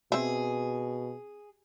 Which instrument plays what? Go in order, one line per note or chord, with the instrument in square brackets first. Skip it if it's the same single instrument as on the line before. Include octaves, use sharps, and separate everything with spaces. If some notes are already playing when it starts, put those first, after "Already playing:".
[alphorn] B2 [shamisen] C4 E5 [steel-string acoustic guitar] G#4